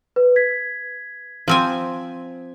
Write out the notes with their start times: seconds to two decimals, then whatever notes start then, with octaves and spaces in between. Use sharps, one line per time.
0.16 B4
0.36 G#6 B6
1.48 F3 C4 G#5